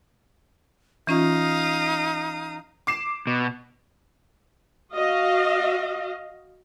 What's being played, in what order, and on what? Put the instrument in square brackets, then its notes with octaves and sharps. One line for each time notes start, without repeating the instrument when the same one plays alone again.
[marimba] E3 C#4 F4 [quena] D#4 [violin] F5 D#6
[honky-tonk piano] D6 C7 E7
[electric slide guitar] B2
[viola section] F#4 D#5 F5